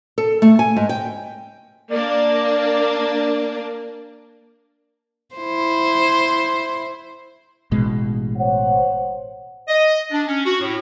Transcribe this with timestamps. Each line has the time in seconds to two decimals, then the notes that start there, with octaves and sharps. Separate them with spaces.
0.18 A4
0.42 A3
0.59 G#5
0.76 G#2
0.89 G5
1.91 A#3 D4 D5
5.35 E4 C5
7.72 A1 B2 G#3
8.38 C5 C#5 F#5
9.68 D#5
10.11 D4
10.27 C#4
10.45 F#4
10.61 A2